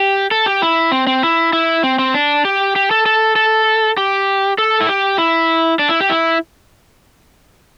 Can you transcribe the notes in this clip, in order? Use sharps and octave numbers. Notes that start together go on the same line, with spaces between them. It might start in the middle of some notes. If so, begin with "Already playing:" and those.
Already playing: G4
A4
G4
E4
C4
C4
E4
E4
C4
C4
D4
G4
G4
A4
A4
A4
G4
A4
E4
G4
E4
D4
E4
G4
E4